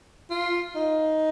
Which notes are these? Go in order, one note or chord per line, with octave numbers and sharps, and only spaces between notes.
F4
D#4